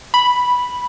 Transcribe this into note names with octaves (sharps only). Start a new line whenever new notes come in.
B5